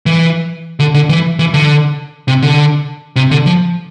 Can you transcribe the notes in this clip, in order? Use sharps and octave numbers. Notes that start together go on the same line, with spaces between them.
E3
D3
D3
E3
E3
D3
C3
D3
C3
D3
F3